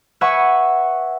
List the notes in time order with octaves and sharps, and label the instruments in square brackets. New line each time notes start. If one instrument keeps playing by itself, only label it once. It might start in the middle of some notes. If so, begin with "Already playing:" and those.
[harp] B4 E5 F#5 G#5 B5 C#6